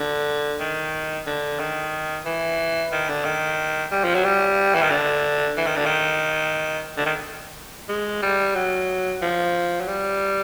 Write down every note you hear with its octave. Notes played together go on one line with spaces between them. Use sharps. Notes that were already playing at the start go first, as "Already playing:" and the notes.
Already playing: D3
D#3
D3
D#3
E3
D#3
D3
D#3
G3
F3
F#3
G3
E3
D#3
D3
E3
D#3
D3
D#3
D3
D#3
G#3
G3
F#3
F3
F#3
G3